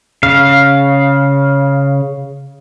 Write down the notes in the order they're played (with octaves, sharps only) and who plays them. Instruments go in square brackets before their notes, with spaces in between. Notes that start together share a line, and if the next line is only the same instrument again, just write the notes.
[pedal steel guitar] C#3 F5